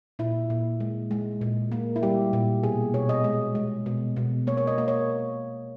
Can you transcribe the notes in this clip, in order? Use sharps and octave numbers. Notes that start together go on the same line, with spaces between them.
A#2 E4
A#2
G#3
G#3
A#2
A#3
E4
G3 G4
A#2
B2 G#4
B2 C#5
D#5
G#3
G#3
B2
B2
A#3 C#5
C#5
D#5
A#3
C#5